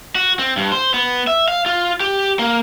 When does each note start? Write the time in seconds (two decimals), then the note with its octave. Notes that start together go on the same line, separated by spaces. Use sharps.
0.15 F#4
0.39 C4
0.57 G2
0.72 C5
0.94 B3
1.27 E5
1.48 F5
1.66 F4
2.00 G4
2.39 A#3